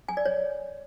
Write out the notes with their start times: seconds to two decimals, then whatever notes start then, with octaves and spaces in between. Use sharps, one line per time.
0.08 G#5
0.17 D5
0.26 C#5